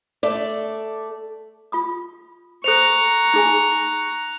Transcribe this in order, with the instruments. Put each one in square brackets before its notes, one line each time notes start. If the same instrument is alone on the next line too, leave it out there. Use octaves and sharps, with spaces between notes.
[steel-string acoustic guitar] A3 D5
[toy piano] F4 B5 D#6
[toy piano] A4 C5 [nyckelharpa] A#5 C#6 [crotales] F#6 C#7 F7
[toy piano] D#4 G#4 G#5